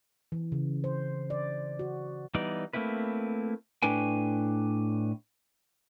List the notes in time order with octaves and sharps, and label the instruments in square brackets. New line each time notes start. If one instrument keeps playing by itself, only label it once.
[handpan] E3
C#3
C5
D5
F#4
[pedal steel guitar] E3 G3 B3 D#4 D5
A3 A#3 C4 E4 B4
[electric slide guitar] A2 D4 B4 G5 G#5